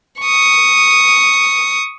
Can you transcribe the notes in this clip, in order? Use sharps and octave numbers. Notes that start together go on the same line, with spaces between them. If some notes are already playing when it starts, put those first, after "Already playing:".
C#6 D#6